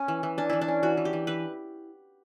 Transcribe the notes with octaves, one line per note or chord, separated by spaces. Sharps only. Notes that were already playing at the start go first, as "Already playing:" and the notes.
Already playing: C#4
E3
E3
C#4 D4
E3 E4
D4
C#4
E3 F#4
E3
G4
E3
E3 B4